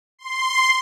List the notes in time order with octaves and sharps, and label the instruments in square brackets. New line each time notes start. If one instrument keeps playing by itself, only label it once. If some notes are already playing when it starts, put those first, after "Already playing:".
[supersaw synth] C6